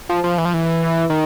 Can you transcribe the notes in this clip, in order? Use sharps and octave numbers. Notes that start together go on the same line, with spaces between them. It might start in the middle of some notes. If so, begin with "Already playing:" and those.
F3
F3
E3
F3
E3
D#3